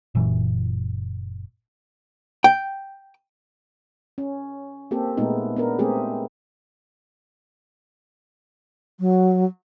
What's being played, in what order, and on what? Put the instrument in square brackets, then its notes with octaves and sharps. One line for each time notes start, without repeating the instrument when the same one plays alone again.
[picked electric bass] F#1 A#2 E3
[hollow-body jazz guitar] G5
[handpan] C#4
A#3 C4 G4 A4
A#2 G#3 A3 B3 D#4
B3 D4 A#4
G#3 A3 B3 C4 G4 G#4
[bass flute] F#3